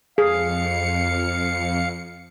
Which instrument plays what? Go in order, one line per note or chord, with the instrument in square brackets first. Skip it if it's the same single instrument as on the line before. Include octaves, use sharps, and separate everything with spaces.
[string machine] F2 C#7 [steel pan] G#4 [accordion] F5